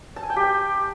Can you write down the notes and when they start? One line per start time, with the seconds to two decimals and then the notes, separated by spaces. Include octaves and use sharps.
0.16 A5
0.23 G#5
0.30 G5
0.36 G4
0.43 G5